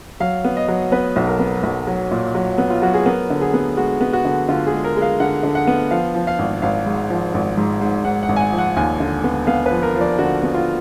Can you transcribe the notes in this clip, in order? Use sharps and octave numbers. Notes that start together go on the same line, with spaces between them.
F#3 F5
B3
D#5
F#3
B3 B4
B1
A#4
B3
B1
F#3
A#2
F#3
B3
F4
F#3 F#4
G#4
B3 A#4
D3
G#4
B3
G#3 F#4
B3
F#4
D3
D3 F4
G#4
G#3
A#4
G#3
F5
D3 F#5
D3
F#5
B3
F3 F5
F3
F5
G#1
G#1 F5
G#2
F3
G#1
G#2
G#2
G#2 F#5
F#5
G#1
G#5
F#5
F3
F#5
D#2 G#5
D3
B3
B3 F5
B4
F3
A#4
F3
D5
D3 F#4
B3
F4